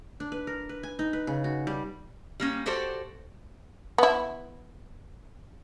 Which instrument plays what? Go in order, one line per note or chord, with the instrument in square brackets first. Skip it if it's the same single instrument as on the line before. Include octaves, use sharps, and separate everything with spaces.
[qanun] D4
B4
A#4
B4
G#5
D#4
B4
C#3
F#4
G3
[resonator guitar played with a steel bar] G3 A#3 C#4
F#4 G4 A4 C5 D5
[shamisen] B3 E4